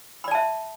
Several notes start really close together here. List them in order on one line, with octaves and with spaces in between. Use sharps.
B5 D5 A5 E5